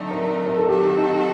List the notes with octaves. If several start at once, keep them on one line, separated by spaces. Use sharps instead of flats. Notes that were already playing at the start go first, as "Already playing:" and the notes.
Already playing: D3 F#3 A3 C4 D#4 D5
A#4
A#4
A4
D#3 F#3 C4 F#4 G4 A4
D#4